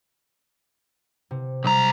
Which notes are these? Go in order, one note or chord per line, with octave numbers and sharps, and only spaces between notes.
C3
B1 G3 A#5